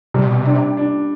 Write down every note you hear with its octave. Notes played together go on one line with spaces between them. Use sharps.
C3 G3
B2
C3
D4
D4